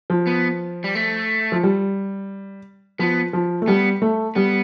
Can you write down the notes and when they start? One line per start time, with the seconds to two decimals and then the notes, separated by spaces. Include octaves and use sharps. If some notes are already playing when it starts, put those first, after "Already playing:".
0.10 F3
0.27 B3
0.84 G3
0.95 A3
1.52 F3
1.63 G3
2.99 F3 B3
3.33 F3
3.62 A3
3.67 G3 B3
4.02 A3
4.35 G3 B3